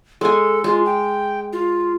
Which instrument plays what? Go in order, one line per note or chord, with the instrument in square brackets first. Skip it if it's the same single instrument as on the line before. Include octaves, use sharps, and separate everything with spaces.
[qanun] G#3 G#5 [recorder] A4
[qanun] G#3 [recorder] F4
[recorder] G5
F4